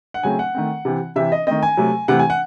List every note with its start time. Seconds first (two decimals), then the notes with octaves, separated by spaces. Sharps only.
0.14 F#5
0.23 C#3 F#3 A3 C4 G#5
0.39 F#5
0.54 D#3 A3 C4
0.85 C3 E3 C4
1.16 C3 E3 C4 E5
1.32 D#5
1.47 D#3 A3 C4 D#5
1.63 G#5
1.77 C3 F#3 A3
2.08 C3 E3 A3 C4 F#5
2.19 G#5
2.30 F#5